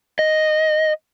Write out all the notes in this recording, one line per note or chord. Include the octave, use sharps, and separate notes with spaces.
D#5